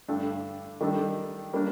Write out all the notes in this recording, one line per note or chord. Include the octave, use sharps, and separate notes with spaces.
G2 D3 A3 D4 A4
D#3 G3 D4 A4
G3 A#3 D4